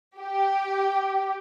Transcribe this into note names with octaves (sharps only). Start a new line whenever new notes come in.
G4